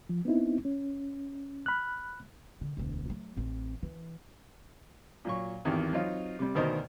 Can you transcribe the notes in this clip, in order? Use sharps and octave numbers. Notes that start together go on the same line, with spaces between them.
F3
B3 C4 D#4 E4
C#4
B5 F6 F#6
D3
E1 D2
F#3 A3
A1 C4
E3
A#2 F#3 C#6
G#1 E2 D#3 G4
F#3 C4 D#4 F4
C3 G3
D2 B2 D#3 A#4 C5 D#5